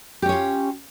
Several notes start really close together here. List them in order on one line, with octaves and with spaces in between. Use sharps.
G4 C#4 C#5 F4